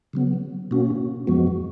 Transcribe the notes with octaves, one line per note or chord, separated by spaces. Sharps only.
C#3 F#3 B3
B2 A#3 C#4 F#4
F2 F3 G#3 B3 F#4